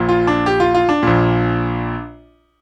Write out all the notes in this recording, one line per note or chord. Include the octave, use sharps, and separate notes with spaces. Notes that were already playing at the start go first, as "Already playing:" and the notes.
Already playing: A#1 A#2
F4
D4
G4
F4
F4
D4
A#1 A#2